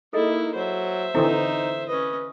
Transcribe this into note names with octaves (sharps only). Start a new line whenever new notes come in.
A#3 D#4 E4 G#4 A4 D#5
F#3 C5 E5
D3 E3 C4 D#4 E4 A4
C#4 B4 D#5